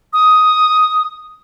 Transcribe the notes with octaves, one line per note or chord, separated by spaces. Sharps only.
D#6